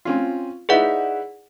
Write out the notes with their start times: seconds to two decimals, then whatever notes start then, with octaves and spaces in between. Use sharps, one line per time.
0.05 C4 C#4 F4
0.69 D#4 E4 G#4 B4 D5 F#5